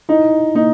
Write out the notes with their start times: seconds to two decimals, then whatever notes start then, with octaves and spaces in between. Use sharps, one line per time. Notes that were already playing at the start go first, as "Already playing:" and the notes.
0.09 D#4 E4
0.55 A#3 D#4